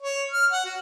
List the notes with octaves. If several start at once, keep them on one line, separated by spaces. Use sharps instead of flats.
C#5
F6
F#5
F#4